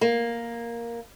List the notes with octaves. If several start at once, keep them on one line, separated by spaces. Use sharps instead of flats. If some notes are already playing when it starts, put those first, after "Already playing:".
A#3